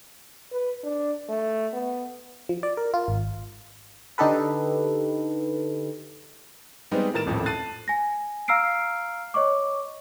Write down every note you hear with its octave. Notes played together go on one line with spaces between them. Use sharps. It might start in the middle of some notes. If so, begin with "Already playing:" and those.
B4
D4
A3
B3
F3
D5
A#4
F4
G#1
D3 D#4 G4 A4 B4
G3 G#3 B3 C4 D#4 G4
A2 D#3 A#4 A6 E7
D#1 A1 F2 A2
A5 F#6 A6 C7 D#7
G#5 A#6
F5 A#5 E6 F6 C7 D7
C#5 D#5 C#6 D6